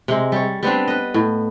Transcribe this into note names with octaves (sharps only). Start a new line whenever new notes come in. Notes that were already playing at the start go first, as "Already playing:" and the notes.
C3 G#3
G3 C#5
G3 B3 C4 D4
B4 D#5
A2